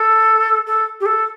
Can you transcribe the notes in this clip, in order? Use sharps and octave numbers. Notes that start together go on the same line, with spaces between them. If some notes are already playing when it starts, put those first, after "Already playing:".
Already playing: A4
A4
G4
A4